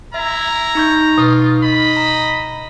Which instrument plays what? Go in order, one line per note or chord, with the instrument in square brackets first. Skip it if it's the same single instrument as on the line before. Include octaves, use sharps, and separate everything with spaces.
[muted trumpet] E4 [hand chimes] E5 [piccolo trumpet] A#5
[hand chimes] D#4 C#6 G6
[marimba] B2 [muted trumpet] F4
[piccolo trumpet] D#5 [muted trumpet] B5
[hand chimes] A#5